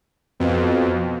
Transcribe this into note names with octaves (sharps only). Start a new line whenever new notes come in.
F2 B2